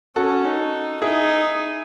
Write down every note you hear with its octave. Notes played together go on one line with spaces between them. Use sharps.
C#4 F#4 A4
D#4
D#4 E4 G#4